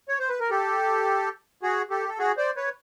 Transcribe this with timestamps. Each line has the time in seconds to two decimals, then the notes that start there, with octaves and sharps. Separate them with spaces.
0.09 C#5
0.19 C5
0.29 B4
0.40 A#4
0.50 G4 A4
1.63 F#4 G#4
1.90 G4 A4
2.09 A4
2.19 F#4 G#4
2.37 C5 D5
2.56 B4 C#5